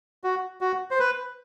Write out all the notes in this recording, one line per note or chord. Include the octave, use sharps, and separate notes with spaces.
F#4
F#4
C5
B4